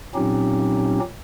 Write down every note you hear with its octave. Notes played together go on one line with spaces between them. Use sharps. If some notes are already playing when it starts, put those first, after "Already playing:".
A#2 F#3 C4 C#4 D#4 G4